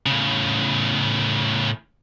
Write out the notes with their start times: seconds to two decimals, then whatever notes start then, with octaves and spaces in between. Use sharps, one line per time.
0.06 A2 C#3